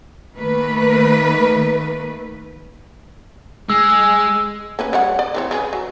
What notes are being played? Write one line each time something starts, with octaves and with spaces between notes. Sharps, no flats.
D#3 A3 A#3 B4
G#3 E6
A#3 C#4 B4
G3 C#5 F#5
D5
E3 C4 C#5
C#3 G#4 B4
F#3